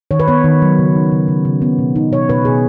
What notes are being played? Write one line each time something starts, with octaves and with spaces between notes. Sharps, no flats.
D#3 C#5
B4
B3 C#5
D#3
F#3
C#3
D#4
C#3
C#3
C#3
B3
B2
D#4
B2 C#5
B2 B4
B2 G#4